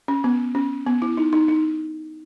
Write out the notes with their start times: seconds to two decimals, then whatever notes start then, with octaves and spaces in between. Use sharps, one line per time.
0.08 C#4
0.24 B3
0.55 C#4
0.87 B3
1.02 E4
1.17 D#4
1.33 D#4
1.48 D#4